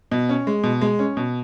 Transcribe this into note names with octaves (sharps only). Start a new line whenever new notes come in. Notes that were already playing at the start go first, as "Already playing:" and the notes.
B2
C#4
G#3
B2
G#3
C#4
B2